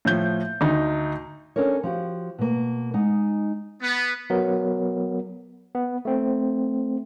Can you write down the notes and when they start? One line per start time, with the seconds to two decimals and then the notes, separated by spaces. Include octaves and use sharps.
0.05 A2 F3 G6
0.61 D2 D#4
1.56 C#4 D4 A4 A#4 C#5
1.83 F3 F#4 G4
2.38 B2 A#3
2.94 G#3 D#4 F#5
3.82 B3
4.30 F#3 B3 A#4
5.75 B3
6.05 A3 C4